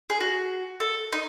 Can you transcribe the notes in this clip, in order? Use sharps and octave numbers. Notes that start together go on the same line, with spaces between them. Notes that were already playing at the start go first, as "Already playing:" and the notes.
G#4
F#4
A4
D#4